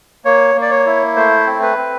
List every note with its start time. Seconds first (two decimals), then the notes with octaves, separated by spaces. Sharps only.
0.25 A#3 C#5
0.55 A#3
0.62 D5
0.70 C#5
0.86 E4
1.16 A3 C5
1.47 C4
1.62 B4
1.77 C4